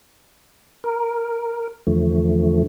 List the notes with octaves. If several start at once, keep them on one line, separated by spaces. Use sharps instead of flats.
A#4
E2 D3 F3 A3